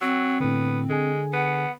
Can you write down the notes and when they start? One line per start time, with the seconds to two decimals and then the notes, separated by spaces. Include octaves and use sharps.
0.01 F#3 C4 E6
0.40 A2 D3 B3
0.89 D3 G#3 G#4 G#5
1.33 B3 F#5